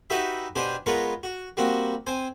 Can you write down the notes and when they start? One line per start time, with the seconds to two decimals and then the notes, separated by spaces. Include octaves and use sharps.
0.10 D#4 F#4 G4 B4 E5
0.56 B2 D4 G4 C5 G#5
0.86 G#3 B3 F4 A#4 B4 C#5
1.23 F#4
1.57 G3 A#3 C4 F#4
2.07 C4 C5 G#5